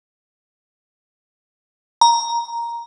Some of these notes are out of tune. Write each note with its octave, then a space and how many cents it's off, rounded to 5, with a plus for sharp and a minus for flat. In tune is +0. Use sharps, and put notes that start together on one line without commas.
A#5 +5